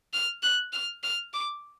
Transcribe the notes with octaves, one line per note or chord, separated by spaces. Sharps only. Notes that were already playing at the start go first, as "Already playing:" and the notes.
F6
F#6
F6
F6
D6